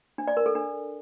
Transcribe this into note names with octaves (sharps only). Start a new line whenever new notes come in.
D4
D5
A#4
A4
D4